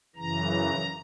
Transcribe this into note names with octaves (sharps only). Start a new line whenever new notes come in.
F#2 C#3 E3 A#5